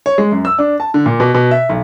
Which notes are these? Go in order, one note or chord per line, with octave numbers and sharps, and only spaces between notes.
C#5
G#3
F#2
E6
D4
A5
D3
A#2
B2
B2
E5
B1